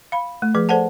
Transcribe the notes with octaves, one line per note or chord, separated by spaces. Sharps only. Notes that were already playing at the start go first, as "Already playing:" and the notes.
F5 B5
A3
F3 G#4 B4
A4 C5 D5 F#5 A5